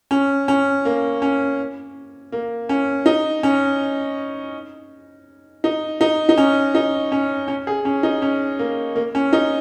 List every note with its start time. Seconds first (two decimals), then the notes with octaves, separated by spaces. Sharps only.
0.11 C#4
0.48 C#4
0.85 A#3
1.22 C#4
2.32 A#3
2.69 C#4
3.06 D#4
3.43 C#4
5.64 D#4
6.01 D#4
6.29 D#4
6.38 C#4
6.75 D#4
7.12 C#4
7.48 C#4
7.67 G#4
7.85 C#4
8.03 D#4
8.22 C#4
8.59 A#3
8.96 A#3
9.15 C#4
9.33 D#4